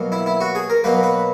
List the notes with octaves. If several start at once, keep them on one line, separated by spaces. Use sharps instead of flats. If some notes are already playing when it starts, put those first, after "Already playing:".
Already playing: B2 F#3 A#3
E4
E4
F#4
G#4
A#4
B2 F#3 A#3 B4
B4